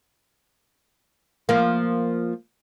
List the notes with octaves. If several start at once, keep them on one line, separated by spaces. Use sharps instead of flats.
F3 A#3